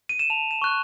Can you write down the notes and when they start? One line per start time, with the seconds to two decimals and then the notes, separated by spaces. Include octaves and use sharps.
0.09 D#7
0.19 E7
0.30 A5 F7
0.51 E7
0.62 C#6 F#6